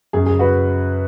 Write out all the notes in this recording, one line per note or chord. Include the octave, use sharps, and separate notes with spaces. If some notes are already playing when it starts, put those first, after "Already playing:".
F#2 G#4
C#3 G#4
F#4 B4